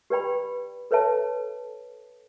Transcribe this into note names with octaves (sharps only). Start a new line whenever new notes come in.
G4 B4 D5 G5 B5
A4 B4 C#5 E5 A5